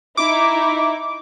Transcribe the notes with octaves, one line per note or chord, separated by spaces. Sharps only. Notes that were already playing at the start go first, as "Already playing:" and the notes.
D#4 E4 D6